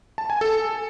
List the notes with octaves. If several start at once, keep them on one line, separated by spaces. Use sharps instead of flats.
A5
G#5
A4